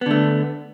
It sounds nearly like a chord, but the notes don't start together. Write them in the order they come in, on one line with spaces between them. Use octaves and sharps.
B3 D3 A3